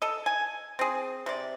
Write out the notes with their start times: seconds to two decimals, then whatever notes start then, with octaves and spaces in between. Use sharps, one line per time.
0.02 A4 D#5
0.26 G#5
0.79 C4 G#4
1.26 C3 D5